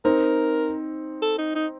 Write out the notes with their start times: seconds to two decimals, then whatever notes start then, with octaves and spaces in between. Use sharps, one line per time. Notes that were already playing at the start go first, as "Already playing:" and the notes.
0.05 C4 D#4 A#4
1.22 A4
1.38 D#4
1.55 D#4